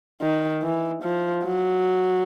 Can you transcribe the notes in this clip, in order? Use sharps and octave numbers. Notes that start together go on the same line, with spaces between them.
D#3
E3
F3
F#3